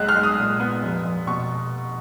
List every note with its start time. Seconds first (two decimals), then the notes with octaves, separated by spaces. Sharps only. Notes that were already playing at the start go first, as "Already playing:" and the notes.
Already playing: B1 G#3 F#6
0.09 F6
0.15 G#3
0.23 D#6
0.38 A#2
0.60 B3
0.83 F1
1.04 F1
1.27 B2 C#6